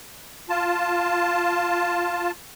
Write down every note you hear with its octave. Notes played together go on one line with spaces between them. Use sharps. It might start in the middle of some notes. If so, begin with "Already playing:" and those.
F4 A5